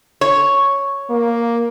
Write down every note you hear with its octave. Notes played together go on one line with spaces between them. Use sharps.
C#5
A#3